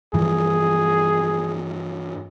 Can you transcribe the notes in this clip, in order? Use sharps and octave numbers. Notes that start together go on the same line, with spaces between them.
G2 E3 F3 G#4